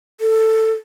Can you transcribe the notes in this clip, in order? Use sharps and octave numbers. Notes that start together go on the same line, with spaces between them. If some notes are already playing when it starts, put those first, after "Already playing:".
A4